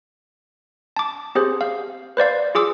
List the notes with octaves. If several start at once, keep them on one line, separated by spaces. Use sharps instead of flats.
A5 D6
C4 G4 G#4 C5
F5
B4 C5 D5 F5
F4 G#4 D6 E6